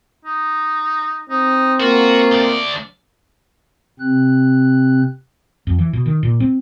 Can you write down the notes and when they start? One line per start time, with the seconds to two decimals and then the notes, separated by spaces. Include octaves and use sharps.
0.25 D#4
1.30 C4 D#4
1.80 A#3 F4 F#4
2.32 D2 D5
4.00 C3 C4 F#6
5.67 F2
5.79 E3
5.93 B2
6.06 D#3
6.23 A#2
6.40 C4